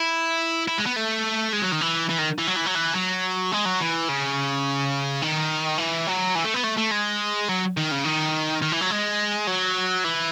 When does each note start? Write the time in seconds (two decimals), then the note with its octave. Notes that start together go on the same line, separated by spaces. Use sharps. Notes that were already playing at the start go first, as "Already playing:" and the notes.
Already playing: E4
0.68 E4
0.78 G#3
0.86 B3
0.96 A3
1.53 G#3
1.62 F#3
1.72 D#3
1.81 E3
2.09 E3
2.18 D#3
2.39 E3
2.47 F#3
2.56 E3
2.66 F#3
2.75 E3
2.95 F#3
3.52 G#3
3.65 F#3
3.80 E3
4.08 C#3
5.22 D#3
5.78 E3
6.07 F#3
6.35 E3
6.45 A3
6.54 B3
6.64 A3
6.78 A3
6.91 G#3
7.49 F#3
7.77 D#3
7.91 C#3
8.05 D#3
8.62 D#3
8.72 E3
8.81 F#3
8.91 G#3
9.47 F#3
10.04 E3